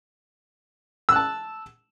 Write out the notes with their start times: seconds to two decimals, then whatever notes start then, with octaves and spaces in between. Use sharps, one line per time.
1.09 E6
1.12 F#6
1.16 A5